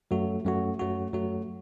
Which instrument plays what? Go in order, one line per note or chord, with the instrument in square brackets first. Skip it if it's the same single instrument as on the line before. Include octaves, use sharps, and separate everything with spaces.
[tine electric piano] F#2 F#3 A3 F#4
F#2 F#3 A3 F#4
F#2 F#3 A3 F#4
F#2 F#3 A3 F#4